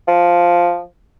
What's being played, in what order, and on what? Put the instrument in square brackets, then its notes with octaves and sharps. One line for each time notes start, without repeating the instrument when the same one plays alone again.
[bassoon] F3